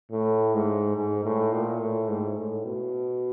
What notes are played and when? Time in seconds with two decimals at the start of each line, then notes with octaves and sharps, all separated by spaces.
0.11 A2
0.54 G#2
0.96 G#2
1.24 A2
1.52 A#2
1.81 A2
2.08 G#2
2.37 A2
2.65 B2